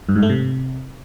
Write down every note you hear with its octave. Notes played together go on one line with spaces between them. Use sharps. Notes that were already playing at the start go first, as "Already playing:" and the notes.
G2
G#2
A3
C3